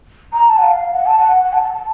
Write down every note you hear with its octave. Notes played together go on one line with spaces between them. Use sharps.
A#5
A5
F#5
F5
F#5
A5
F#5
F#5
A5
A5
A5